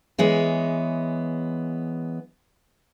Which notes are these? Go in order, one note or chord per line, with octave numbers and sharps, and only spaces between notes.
E3 G#3 B3 C#5